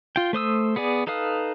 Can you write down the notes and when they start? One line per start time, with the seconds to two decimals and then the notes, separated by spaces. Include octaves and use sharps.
0.16 F4 G5
0.33 A3 C5 D#6 E6
0.76 B3 G#4 D5 G#5
1.07 D#4 A4 B4 F5 D#6